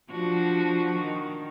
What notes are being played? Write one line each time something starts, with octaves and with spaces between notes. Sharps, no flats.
F3 D4 F#4
D#3